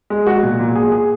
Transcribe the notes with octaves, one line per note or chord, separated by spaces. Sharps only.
G#3
F#4
A#2
A#2
G#4
G#4